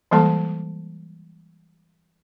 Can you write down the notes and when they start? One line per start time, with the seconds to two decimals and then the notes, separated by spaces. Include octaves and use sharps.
0.11 E3 G3 G#3 A#3 A4 A5